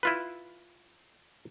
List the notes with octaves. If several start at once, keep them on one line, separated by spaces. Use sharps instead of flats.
E4 F4 B4